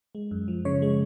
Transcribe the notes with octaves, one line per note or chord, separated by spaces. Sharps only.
G#3
F#2
F3
C#3 C#5
G#3